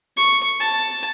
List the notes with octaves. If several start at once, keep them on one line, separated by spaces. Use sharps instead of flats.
C#6
A5